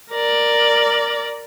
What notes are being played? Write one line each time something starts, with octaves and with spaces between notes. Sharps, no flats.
A#4 D5